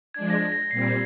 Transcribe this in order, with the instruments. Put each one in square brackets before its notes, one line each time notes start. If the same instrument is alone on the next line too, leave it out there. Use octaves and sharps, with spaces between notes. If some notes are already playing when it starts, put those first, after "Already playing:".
[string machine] F3 G#3 D4 [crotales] G#6
[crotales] A#6
G#6
A#6
[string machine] A#2 G3 C4 [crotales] C7
[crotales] C7